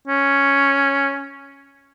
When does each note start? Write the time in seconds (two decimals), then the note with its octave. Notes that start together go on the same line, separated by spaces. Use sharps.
0.08 C#4